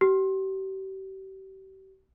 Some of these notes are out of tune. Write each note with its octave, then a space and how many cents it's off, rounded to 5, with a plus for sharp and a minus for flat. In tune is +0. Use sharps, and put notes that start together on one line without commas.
G4 -35